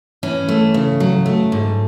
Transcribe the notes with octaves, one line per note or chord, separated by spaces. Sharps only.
E3 C#4
A3
C#3
F#3
A3
G#2